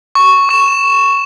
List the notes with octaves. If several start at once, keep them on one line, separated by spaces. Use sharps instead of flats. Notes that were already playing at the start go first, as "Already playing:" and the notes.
C#6
C#6 E7